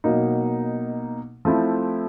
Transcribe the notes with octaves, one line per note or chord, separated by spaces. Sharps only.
B2 F#3 A#3 D#4
F3 A3 C4 E4